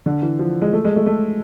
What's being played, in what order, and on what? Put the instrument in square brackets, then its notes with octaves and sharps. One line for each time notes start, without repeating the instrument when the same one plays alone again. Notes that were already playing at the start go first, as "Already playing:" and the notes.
[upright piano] D3
E3
F3
G#3
A3
G#3
A3
A3